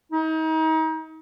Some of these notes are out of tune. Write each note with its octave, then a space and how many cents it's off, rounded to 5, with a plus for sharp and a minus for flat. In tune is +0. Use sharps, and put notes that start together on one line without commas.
D#4 +35